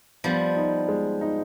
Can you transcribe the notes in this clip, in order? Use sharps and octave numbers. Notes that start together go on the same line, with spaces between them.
F3 G3 B3
D#4
G#3
D#4